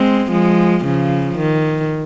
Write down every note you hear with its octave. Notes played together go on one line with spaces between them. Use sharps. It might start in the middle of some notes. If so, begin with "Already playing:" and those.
Already playing: G#3 C4
F3 G#3
C#3 F3
D#3